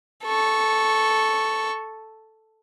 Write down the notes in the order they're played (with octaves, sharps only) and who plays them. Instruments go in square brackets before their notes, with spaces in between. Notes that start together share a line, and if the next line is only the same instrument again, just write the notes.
[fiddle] A4 C#6